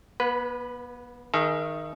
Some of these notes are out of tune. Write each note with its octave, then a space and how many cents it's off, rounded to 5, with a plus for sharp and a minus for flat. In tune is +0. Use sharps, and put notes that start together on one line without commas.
B3 -40 B4 +0
D#3 +0 G#4 +25 E5 +40